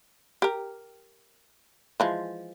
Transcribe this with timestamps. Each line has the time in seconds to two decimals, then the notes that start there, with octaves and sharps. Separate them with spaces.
0.42 G4 A#4
2.00 E3 F3 G#3